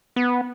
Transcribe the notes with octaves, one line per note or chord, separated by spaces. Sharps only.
B3